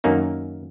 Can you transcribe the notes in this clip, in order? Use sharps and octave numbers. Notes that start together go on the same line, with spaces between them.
F#2 D#3 A#3 C#4 D#4